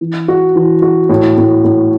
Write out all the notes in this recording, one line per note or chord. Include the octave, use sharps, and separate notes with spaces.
E3
F#4
E3
F#4
A2
A2
A2